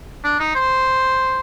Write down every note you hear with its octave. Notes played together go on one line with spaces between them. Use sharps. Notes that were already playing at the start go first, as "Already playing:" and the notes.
D4
D#4
C5